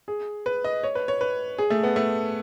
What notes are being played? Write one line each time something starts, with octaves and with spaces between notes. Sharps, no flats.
G#4
B4
D#5
C#5
B4
C#5
B4
G#4
A3
B3
A3